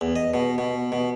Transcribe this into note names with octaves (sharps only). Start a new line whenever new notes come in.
E2
D#5
B2
B2
B2